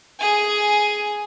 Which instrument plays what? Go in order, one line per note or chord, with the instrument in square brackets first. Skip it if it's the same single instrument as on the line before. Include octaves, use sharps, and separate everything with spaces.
[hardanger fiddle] G#4 G#5